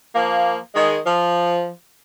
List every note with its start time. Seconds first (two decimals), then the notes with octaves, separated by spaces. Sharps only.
0.14 F3 A#3
0.74 D#3 G#3
1.05 F3